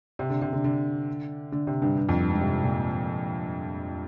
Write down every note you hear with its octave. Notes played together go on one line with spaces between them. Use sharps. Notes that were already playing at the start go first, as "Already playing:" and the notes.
C3
D3
C3
D3
D3
D3
C3
G2
G2
F2
G2
G#2
C3
A#2